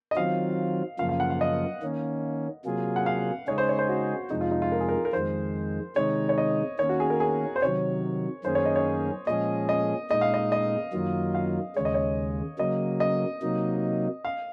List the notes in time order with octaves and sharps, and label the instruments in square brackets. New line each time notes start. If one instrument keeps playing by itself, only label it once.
[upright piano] D#5
[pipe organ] D#3 F#3 C4 F4 [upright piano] F5
[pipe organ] F#2 C#3 F3 A#3 F4 [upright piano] F5
[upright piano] F5
F#5
F5
D#5
[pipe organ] D#3 A#3 C#4
C3 F#3 A#3 F4 G#4
[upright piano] F#5
F5
[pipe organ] C#3 G#3 D#4 G#4 [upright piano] C#5
[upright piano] C5
C#5
C5
F#4
[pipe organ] F2 C3 F3 G#3 [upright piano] D#4
[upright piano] F4
D#4
F4
A#4
G#4
A#4
A#4
[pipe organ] F2 D#3 G#3 [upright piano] C5
[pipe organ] C3 D#3 G#3 D#4 [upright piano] C#5
[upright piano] C#5
D#5
[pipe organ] D#3 A#3 C#4 [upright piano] C#5
[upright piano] F#4
G#4
A#4
G#4
C5
[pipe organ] C3 D#3 F#3 [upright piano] C#5
[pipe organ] F#2 D#3 A#3 C#4 G#4 [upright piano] C5
[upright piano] C#5
D#5
C#5
[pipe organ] A#2 F3 G#3 C#4 G#4 [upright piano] D#5
[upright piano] D#5
[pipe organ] A#2 G#3 D#4 [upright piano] D#5
[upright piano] F5
D#5
D#5
[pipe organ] F#2 D#3 F#3 A#3 F4
[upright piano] F5
[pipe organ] D#2 C#3 G#3 [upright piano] C#5
[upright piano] D#5
C#5
[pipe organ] C#3 F#3 A#3 [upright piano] D#5
[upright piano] D#5
[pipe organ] C3 F#3 A#3 D#4
[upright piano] F5